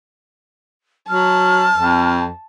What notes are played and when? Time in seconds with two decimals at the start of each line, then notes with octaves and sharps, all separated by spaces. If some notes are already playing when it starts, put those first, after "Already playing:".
1.09 F#3 A5 F6
1.74 F2